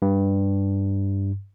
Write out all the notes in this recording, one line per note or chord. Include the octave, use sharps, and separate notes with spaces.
G2